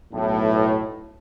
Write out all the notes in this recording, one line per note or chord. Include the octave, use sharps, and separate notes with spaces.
B1 A2